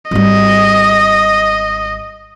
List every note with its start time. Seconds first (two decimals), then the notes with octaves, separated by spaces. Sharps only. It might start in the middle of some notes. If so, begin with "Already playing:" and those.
0.11 G#1 G3 D#5